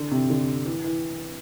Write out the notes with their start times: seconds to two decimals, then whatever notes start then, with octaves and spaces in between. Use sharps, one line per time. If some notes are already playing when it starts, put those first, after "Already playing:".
Already playing: D3
0.11 C3
0.30 D3
0.66 E3
0.84 E3